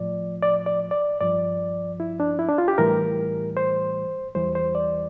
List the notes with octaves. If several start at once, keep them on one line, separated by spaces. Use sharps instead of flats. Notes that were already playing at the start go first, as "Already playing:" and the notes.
Already playing: A2 F3 D5
D5
D5
D5
G2 F3 D5
E4
D4
E4
D4
F4
G4
A2 E3 G3 A#4
C5
E2 E3 G3 C5
C5
D5